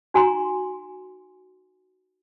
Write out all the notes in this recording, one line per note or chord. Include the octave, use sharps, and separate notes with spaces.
D#4 F#4 G#5 A#5 C6